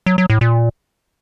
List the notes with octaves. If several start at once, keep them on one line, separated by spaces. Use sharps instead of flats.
F#3
F#3
A2
A#2